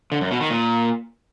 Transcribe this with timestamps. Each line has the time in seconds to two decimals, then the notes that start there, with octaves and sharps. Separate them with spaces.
0.12 D3
0.21 F#2
0.31 B2
0.41 D#3
0.50 A#2